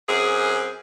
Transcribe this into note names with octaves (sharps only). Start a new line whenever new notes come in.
F#2 C4 G#4